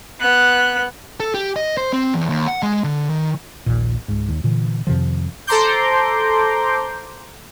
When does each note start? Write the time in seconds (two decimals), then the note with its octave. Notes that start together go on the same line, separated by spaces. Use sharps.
0.20 B3 F#6
1.20 A4
1.34 G4
1.56 D#5
1.77 C5
1.93 C4
2.14 E2
2.29 D#2
2.48 F#5
2.63 G#3
2.84 D3
3.10 D#3
3.66 A#1 D#2 A#2
4.08 C#2 G#2
4.28 D#2
4.44 A#2 D3 E3
4.87 F2 C3 D#3 F3
5.47 A4 C5 A#5 C6 D6 G6